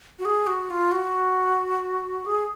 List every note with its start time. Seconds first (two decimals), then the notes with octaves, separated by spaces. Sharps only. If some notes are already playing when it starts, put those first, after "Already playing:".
0.19 F#4
0.25 G#4
0.47 F#4
0.70 F4
0.92 F#4
2.26 G#4